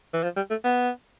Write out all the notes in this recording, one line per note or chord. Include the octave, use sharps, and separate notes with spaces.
E3
F3
G3
A3
B3